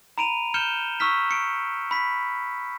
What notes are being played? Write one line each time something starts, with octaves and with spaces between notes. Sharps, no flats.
A#5 B5 D7 D#7 F7
F6 G6 C#7 E7 G7
C#6 E6 F6 B6
C#7 D7
B5 B6